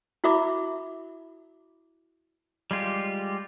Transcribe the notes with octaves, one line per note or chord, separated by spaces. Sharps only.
E4 F#4 A#4 E5 B5 D6
G3 G#3 F4 G4